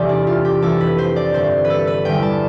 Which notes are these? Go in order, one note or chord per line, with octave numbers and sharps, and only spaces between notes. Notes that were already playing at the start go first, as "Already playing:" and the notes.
Already playing: E2 C3 E3 A3 G4 A4 D5
D4
F4
G4
F2 E3 A3 A4
B4
C5
D5
G2 D3 A3 C5
B4
A4
B4
E2 D3 G3 G5
A5